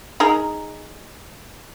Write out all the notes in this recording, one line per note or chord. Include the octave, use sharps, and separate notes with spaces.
D#4 G#4 A#4